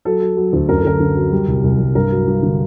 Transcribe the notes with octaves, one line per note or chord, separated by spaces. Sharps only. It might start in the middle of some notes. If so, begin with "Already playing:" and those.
F#3 A4
F#3
F#3
D2
F#2 A#4
A4
D3 A#4
D3
F#3
G3
C2
C2
C2
G2 A#4
F#3
G2
D3